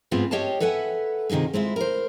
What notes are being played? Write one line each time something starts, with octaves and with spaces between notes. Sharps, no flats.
G#2 B3 C4 F4 F#4 G#4
G4 C#5 D#5 F5 G5 A5
A4 B4 E5 F#5 G#5
C3 D#3 D#4 F4 G#4
G#3 C4 E4 F4
A#4 C5